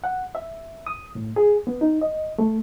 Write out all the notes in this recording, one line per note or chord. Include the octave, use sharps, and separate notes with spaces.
F#5
E5
D#6
A2
G#4
B3
D#4
D#5
A3